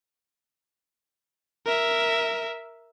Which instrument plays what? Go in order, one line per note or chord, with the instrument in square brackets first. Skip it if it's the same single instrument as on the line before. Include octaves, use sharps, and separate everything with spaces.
[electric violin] A#4 E5